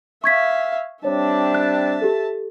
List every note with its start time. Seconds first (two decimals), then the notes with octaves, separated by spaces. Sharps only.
0.24 E5 F5 C#6 G#6 B6
1.04 G3 C4 D4 C#5 E5 A5
1.54 F#6
2.02 G4 A4